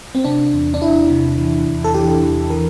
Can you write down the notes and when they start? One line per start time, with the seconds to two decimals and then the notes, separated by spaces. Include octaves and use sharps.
0.15 C4
0.24 C3 D4
0.54 E2
0.74 D4
0.81 E2 E4
1.10 C3
1.38 E3
1.67 E2
1.84 A4
1.94 E3 G4
2.22 E2
2.50 E3 A#4